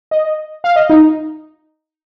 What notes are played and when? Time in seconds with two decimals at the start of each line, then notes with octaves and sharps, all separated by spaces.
0.11 D#5
0.64 F5
0.76 D#5
0.90 D#4